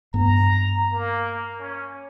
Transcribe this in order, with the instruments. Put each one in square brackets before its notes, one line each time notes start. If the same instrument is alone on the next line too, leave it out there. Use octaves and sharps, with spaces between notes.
[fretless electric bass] G2 B3 [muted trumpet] A#5
[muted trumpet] A#3
C#4